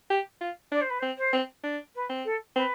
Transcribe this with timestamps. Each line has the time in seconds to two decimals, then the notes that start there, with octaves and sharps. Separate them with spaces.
0.10 G4
0.41 F4
0.72 D4 D5
0.81 C5
0.89 B4
0.99 C5
1.02 C4
1.17 C5
1.33 C4
1.63 D4
1.95 B4
2.10 C4
2.25 A4
2.55 C4 B4